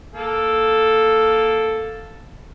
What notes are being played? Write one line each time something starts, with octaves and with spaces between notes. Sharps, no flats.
A#3 A4